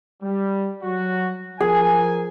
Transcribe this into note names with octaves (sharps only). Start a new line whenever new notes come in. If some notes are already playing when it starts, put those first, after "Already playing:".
G3
F#3 F#4
F3 G#4 A#4 G#5